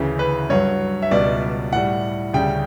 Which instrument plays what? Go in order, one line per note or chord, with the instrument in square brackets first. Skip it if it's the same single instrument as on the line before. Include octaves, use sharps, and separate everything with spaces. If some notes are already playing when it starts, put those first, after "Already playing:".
Already playing: [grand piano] D2 C#3 E3
B4
G2 F#3 C#5
E5
C#2 B2 G3 D5
A2 G3 F#5
D2 C#3 G3 G5